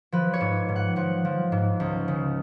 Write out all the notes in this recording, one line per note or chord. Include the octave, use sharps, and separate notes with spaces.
F3 B4
C#5
G#2
G#2
F#5
F3 F#5
F3
G#2
C#2
C#3